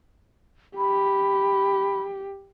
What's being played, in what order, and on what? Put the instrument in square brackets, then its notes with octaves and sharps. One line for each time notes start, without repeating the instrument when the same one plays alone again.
[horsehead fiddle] G4 [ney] B5